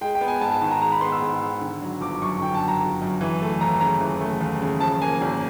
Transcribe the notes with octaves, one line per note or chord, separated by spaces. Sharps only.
G#3 G5
G5
B3
G#5
G#2 A5
A5
D#3 A5
A#5
G#3 A#5
B5
B3 C6
E6
G#2
D#3
D3
F#3
G1 D6
F#2 C#6
D3 G5
A5
F#3
A#5
G1
F#2
E3
A3
D#2 A#5
C#3 A#5
E3
A3
D#2
C#3
F3 A5
A#3 G#5
G#1